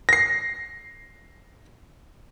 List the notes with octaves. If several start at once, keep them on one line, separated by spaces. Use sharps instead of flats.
A#6 C7